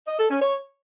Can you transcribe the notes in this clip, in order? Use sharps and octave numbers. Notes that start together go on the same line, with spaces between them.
D#5
A4
C#4
C#5